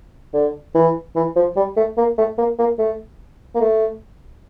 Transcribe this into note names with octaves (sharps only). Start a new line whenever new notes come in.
D3
E3
E3
F3
G3
A3
A#3
A3
A#3
A#3
A3
A#3
A3